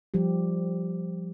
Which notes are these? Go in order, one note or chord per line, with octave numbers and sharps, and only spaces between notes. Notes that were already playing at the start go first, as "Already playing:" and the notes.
F3 G3 G4